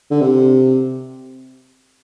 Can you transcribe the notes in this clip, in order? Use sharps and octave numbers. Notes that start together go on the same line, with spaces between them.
D3
C3